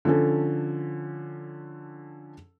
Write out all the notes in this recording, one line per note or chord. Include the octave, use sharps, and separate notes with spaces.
D3 F3 C#4 A4